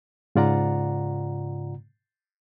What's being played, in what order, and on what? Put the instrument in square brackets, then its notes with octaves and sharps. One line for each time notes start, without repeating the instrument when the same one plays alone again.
[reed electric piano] G#2 C#3 F4 D5 F#5 A#5